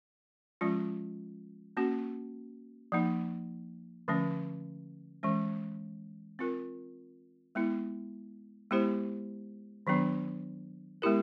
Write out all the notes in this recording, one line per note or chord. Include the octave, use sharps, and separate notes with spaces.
F3 G#3 C#4 F4
A#3 C#4 F#4
F3 A#3 D#4
D3 F3 A3 C#4
E3 G#3 C#4
C4 F4 A#4
G#3 B3 E4
G#3 B3 E4 G4 C5
D#3 F#3 B3 D4
G#3 B3 E4 G4 A#4